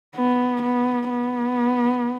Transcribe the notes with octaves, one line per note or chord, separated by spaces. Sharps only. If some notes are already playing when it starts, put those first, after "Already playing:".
B3
B3
B3